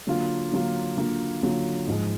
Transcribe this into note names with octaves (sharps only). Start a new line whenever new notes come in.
D3 F#3 A#3 F4
D3 F#3 A#3 F4
D3 F#3 A#3 F4
D3 F#3 A#3 F4
G#2 F3 G#3